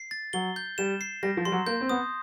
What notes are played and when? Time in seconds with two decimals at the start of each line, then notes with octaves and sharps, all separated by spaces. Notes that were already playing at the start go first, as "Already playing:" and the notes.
Already playing: C7
0.11 A6
0.33 F#3 G7
0.56 G6
0.78 G3 E7
1.01 C7
1.23 G3 A#6
1.37 F3
1.45 G3 C6
1.52 F#3
1.67 A#3 G6
1.81 C4
1.89 B3 D#6